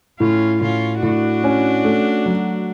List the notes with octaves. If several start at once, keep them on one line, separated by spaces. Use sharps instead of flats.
A2 C#4 F4
A2 C#4 F4
A2 D4 F#4
C#4
A3
F#3